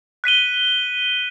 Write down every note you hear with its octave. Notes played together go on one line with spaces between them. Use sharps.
F#6 B6 D#7 G7